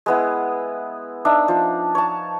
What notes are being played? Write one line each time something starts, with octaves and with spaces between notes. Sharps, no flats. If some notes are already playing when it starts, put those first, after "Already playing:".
G#3 B3 E4
D4 D#4 E5
F3
C#5 A5